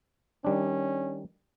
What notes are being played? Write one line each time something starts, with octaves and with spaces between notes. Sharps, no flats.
D#3 G3 C#4 D4